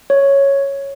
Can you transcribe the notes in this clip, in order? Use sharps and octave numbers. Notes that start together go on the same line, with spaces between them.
C#5